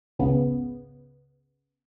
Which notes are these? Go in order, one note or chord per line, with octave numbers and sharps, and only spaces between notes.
G#1 C#2 C#3 B3